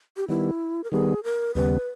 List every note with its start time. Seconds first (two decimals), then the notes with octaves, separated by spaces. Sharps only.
0.17 G4
0.28 D#3 G3 B3 E4
0.84 A#4
0.92 D#3 G3 B3 G#4
1.24 A#4
1.55 D#2 C#3 G3 B3 B4